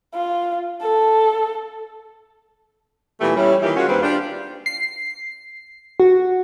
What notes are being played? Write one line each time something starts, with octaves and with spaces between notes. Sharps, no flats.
F4
A4
A#2 E3 G3 A3 B3 G4
G3 C#4 E4
D#3 E3 A#3 E4 F4 G4
G#3 C#4 F4 F#4
D#2 G3 A#3 C4 B4
D4 F4 G4
C7
F#4